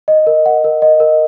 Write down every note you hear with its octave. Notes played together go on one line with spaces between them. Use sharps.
D#5
A#4
F#5
A#4
D#5
A#4